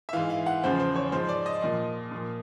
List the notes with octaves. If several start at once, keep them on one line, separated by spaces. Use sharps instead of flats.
E5
G#2 E3 F5
F5
F#5
E2 C#3 F3 C5
C5
C#5
G#2 F3 C5
D5
D#5
A#2 F3 D#5
A#2 F3